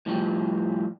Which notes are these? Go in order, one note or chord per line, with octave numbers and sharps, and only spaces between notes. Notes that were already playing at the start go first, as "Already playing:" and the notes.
A2 F3 G3